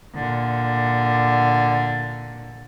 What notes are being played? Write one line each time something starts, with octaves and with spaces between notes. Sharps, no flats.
A#2 D3